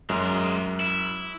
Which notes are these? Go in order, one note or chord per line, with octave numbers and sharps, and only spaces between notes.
F#2 G#3 A#4
E4